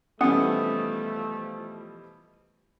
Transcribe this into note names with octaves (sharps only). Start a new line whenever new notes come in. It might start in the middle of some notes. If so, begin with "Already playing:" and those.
B2 E3 F3 G3 A3 C#4 F#5 D#6